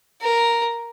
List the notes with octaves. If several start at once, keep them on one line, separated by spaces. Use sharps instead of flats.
A#4